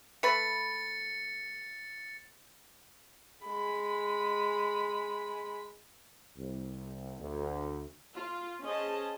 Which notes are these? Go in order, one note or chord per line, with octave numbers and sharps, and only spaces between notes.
A3 B4 B5 A6 C#7
G#3 B5
C2
D2
F4
C#4 G#4 C5 D#5 A5